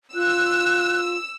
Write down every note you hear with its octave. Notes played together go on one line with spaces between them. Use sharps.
F4 E6 F#6